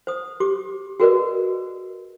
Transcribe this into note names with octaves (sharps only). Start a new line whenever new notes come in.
C5 D#6
G4 D6
F#4 G#4 A#4 B4 D5 D#5